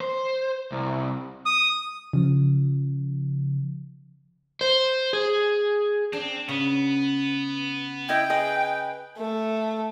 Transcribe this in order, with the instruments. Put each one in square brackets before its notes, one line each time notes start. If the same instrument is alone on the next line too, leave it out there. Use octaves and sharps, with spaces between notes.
[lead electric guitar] C5
C2
[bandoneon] D#6
[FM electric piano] C#3 F3
[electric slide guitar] C5
G#4
[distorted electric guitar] C4 [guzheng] D4
[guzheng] C#3 [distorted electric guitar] B3
[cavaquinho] E4 D#5 [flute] G5
[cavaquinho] G#4 B4 D#5
[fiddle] A3